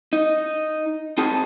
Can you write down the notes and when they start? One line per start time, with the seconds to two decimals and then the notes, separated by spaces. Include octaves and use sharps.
0.13 D#4
1.18 C4 D#4 G#4 A5